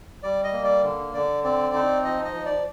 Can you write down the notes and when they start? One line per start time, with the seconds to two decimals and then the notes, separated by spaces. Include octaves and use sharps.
0.23 G3 D5
0.44 D#5
0.53 A#3
0.64 D5
0.83 D3
1.14 D3 D5
1.44 C4 D5
1.75 D#4
2.05 F3 D#5
2.25 D#5
2.34 F3
2.46 D5